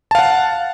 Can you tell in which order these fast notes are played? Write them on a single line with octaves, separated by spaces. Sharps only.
A5 F5 F#5